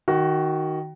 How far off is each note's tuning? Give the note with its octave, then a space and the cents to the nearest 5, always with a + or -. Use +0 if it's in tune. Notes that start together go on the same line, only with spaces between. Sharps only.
D#3 +0 F#4 +15